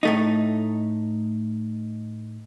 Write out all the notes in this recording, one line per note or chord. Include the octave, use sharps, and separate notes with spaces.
A2 A3 D#4